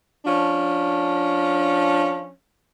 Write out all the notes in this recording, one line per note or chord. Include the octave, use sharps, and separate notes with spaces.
F3 C#4 D4